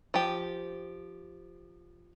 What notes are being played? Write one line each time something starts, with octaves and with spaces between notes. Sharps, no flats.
F3 G4